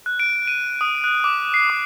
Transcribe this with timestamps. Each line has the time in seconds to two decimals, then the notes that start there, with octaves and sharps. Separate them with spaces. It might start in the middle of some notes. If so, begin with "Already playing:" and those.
0.06 F#6
0.20 D7
0.47 D#7
0.81 D#6
1.04 F#6
1.24 D6
1.54 C7
1.70 D6